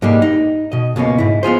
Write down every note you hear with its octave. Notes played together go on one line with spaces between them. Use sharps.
G#2 G3 G#3 A#3
D#4
B2 D#5
C#2 B2 A#3 C#4
G#2 E4
B3 F4 G#4 C5